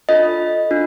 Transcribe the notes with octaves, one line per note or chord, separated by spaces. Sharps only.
D4 F4 A4 D#5
D4 F4